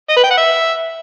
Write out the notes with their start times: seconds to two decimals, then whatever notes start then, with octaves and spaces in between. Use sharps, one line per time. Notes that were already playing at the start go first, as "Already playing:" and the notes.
0.09 D#5
0.16 B4
0.23 G5
0.31 F#5
0.38 E5